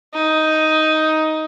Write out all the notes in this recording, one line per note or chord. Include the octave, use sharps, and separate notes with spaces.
D#4